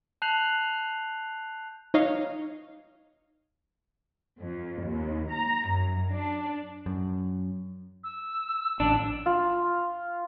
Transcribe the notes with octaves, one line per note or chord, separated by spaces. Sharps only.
A5 F#6 G6 C7 F7 F#7
D#4 C#5 D#5 F5
F2
D#2
A#5
F#2
D4
F#2
E6
A1 E3 D4
F4